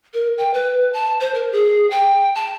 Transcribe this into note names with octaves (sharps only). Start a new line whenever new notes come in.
A#4
G5
B4
A5
C5
A#4
G#4
G5
A5